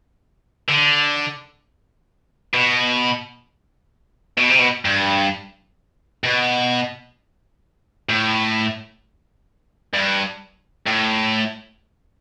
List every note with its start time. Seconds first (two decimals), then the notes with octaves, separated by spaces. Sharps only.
0.69 D3
2.54 B2
4.38 B2
4.50 C3
4.59 B2
4.85 G2
6.24 B2
8.09 A2
9.94 G2
10.87 A2